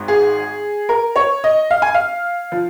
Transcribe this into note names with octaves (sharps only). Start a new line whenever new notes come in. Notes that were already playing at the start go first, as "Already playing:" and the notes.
Already playing: G#1 G#2
G#4
A#4
C#5
D#5
F5
G#5
F5
F3